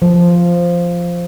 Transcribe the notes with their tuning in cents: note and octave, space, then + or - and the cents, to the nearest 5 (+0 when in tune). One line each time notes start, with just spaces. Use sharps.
F3 -5